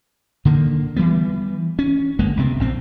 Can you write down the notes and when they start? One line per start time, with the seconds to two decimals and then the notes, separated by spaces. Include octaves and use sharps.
0.45 D3 D#3 A#3
0.96 E3 F#3 G3 B3
1.79 C#4
2.19 G1 G#3 A#3
2.37 C#2 C3 B3 C4
2.60 A#1 A2 C4